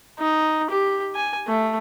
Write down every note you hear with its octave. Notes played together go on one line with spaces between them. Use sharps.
D#4
G4
G#5
A3